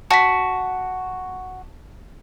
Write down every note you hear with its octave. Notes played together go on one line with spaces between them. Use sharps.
F#4 A5 B6